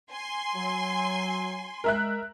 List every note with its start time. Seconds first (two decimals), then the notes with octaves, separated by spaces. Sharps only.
0.11 G#5 C6
0.55 F#3
1.84 G#3 A#4 E5 F#6